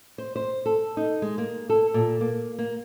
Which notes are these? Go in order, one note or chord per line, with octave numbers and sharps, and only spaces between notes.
C5
C5
A4
D#4
G#3
A#3
A4
A#2
A#3
A#3